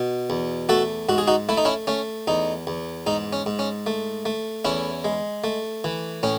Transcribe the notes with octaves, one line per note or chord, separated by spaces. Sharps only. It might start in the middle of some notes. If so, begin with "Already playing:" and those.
Already playing: B2
E2
A3 F#4 A4
G#2 F#4
G#4
D#4 F#4
A3 E4
D#4
C#4 E4
A3 C#4
E2 D#4
E2
G#2 D#4
C#4
G#2
C#4
A3
A3
E2 C#4 E4
G#3
A3
E3
A2 C#4